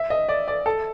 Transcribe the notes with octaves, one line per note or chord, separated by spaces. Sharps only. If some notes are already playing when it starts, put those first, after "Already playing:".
Already playing: E5
D#5
D5
D5
A4